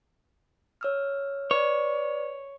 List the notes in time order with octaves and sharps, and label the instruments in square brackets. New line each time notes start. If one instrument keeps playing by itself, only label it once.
[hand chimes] C#5 E6 F6
[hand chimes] B4 D5 [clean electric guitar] C#5